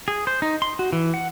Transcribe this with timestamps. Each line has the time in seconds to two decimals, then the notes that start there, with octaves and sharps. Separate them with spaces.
0.08 G#4
0.27 C5
0.42 D#4
0.62 C6
0.79 F#4
0.93 E3
1.14 F#5